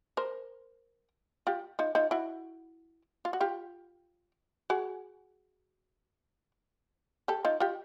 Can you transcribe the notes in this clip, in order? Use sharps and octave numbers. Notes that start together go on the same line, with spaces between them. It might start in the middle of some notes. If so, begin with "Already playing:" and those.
A#4 C5
F4 G4
D#4 F4
D#4 F4
E4 F#4
F4
F#4
F4 G4
F#4 G#4
G4 A4
D#4 F4
F4 G4